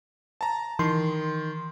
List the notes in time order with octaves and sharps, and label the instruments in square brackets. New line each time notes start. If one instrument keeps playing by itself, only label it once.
[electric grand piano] A5 A#5
[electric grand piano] D#3 [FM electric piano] E3 C6